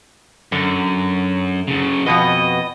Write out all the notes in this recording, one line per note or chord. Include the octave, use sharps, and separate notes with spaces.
F#2 D3
F#2 C#3
F2 B2 B3 D#5